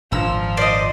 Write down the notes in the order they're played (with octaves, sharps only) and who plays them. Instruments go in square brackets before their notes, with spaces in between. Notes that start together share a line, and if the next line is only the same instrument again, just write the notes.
[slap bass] G#1 A#2 D4 [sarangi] F3 [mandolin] A#5 E6
[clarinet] C5 [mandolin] D5 D#5